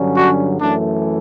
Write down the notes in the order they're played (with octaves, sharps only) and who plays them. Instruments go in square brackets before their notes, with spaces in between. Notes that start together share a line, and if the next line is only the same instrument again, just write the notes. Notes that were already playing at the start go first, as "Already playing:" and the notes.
Already playing: [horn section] G2 D3 F#3 C#4
D4 F#4
F#2 E3 A3 D4